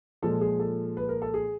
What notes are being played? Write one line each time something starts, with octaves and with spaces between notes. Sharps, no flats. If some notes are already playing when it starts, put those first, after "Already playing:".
A#2 F3 G#3 A4
G#4
A4
B4
A#4
A4
G#4